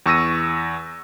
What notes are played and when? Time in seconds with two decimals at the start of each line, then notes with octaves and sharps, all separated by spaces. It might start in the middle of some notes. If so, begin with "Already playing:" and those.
0.06 E2 C#6 E6 A#6 D#7